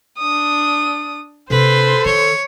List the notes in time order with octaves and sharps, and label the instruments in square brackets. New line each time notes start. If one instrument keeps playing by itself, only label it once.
[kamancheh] D4 D#6
[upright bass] C3 D4 [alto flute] A4 [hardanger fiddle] B4 [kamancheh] C5 C6
[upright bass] D#3 [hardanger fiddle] C#5